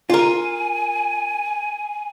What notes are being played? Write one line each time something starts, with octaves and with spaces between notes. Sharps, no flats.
F4 A#4 G#5